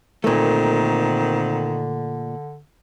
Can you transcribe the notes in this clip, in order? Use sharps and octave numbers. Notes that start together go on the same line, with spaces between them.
A#2 D3 D#3 A3 A#3 C4